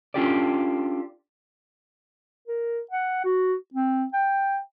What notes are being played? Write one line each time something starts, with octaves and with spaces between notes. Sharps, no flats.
C#4 D4 F4 G4 A4 D5
A#4
F#5
F#4
C4
G5